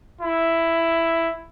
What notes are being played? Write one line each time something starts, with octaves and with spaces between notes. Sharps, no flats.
E4